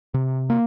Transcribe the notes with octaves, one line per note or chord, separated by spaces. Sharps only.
C3
A#3